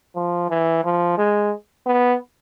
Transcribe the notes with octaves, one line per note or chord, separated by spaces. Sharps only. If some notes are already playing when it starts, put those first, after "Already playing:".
F3
E3
F3
G#3
B3